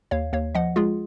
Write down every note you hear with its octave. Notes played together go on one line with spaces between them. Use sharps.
D#2 C#5 F5
D#2 C#5 F5
F3 D#5 F#5
G#3 F4 G#4